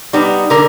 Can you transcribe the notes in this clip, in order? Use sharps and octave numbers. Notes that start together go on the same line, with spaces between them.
G3 B3 D#4
D3 A#4